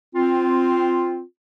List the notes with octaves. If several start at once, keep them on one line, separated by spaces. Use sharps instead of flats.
C4 F4